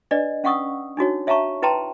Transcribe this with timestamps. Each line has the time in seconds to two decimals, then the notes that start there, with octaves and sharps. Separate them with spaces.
0.11 D4 B4 D5 D#5
0.44 C#4 F5 F#5 C#6 D#6 E6
0.97 D4 D#4 F#4 C#5
1.27 C#5 E5 F5 A5 A#5 C#6
1.62 E4 B4 G5 A5 A#5 C6